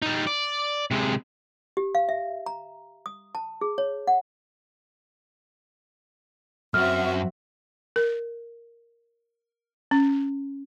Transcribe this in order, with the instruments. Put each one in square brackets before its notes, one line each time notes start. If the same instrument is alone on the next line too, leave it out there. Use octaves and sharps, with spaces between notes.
[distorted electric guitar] G3 D#4
D5
C3 G#3
[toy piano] G4
F5
E5
A#5
D#6
A5
G#4
C#5
F#5
[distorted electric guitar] F#2 [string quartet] C4 F#4 E5 [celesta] F6
[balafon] A#4
C#4